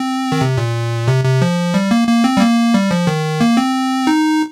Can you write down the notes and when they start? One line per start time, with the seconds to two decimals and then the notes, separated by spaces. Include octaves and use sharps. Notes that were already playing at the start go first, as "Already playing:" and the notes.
Already playing: C4
0.32 D#3
0.41 C3
0.57 A#2
1.08 C3
1.24 C3
1.42 F3
1.74 G3
1.91 A#3
2.08 A#3
2.24 C4
2.37 G3
2.41 A#3
2.74 G3
2.91 F3
3.07 D#3
3.41 A#3
3.57 C4
4.07 D#4